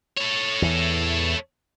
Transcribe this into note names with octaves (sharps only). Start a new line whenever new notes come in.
A4 C#5
E2 E3